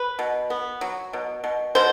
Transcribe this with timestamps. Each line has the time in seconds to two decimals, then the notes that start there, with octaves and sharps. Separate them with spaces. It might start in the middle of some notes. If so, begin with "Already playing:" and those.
Already playing: B4
0.19 B2
0.50 B3
0.81 F#3
1.13 B2
1.44 B2
1.75 B2 C5